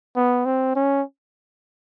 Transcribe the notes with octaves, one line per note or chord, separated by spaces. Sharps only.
B3
C4
C#4